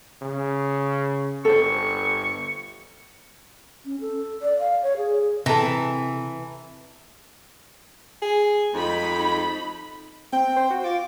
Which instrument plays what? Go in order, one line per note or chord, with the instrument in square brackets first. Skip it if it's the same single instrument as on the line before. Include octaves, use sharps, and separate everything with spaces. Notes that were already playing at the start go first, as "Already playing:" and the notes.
[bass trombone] C#3
[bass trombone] G1 [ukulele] A4 C5 [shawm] C#6
[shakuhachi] C#4
A4
D5
F5
C#5
G#4
[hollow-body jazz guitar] C3 [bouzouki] E3 [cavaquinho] A4 A#5
[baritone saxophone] G#4
[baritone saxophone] F2 [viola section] D#4 B5
[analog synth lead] C4 [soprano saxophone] G5
[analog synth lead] C5
F#4
[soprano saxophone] F4 [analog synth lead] D6